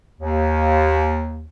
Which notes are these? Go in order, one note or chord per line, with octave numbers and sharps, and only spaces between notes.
D#2